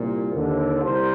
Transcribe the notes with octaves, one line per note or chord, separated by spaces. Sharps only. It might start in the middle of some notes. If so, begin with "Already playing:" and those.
Already playing: C2 A#2
D#2 D3
C2 A#4 C5